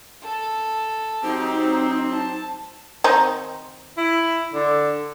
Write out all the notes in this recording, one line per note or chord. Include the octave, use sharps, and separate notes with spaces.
A4
F#3 C4 D#4 G4
A5
D#3 C4 D#4
E4
D3